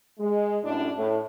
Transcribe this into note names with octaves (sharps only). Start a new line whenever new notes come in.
G#3
F#2 A2 D4
A2